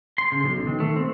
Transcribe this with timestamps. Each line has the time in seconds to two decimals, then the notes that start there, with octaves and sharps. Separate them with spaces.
0.18 C6
0.32 C#3
0.44 B1
0.67 D#3
0.80 A3
0.96 C4